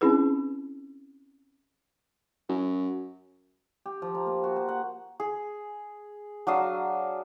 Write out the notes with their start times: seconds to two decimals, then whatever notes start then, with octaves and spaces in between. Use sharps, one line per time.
0.01 C4 C#4 D#4 E4 G#4 B4
2.49 F#2
3.86 G4
4.02 F3
4.15 A#5
4.26 A#3
4.44 F#4
4.56 C5
4.68 F#5
5.20 G#4
6.47 F#3 D4 F5 D#6